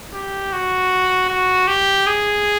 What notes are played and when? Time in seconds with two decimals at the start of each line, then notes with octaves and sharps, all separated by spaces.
0.14 G4
0.52 F#4
1.29 F#4
1.67 G4
2.07 G#4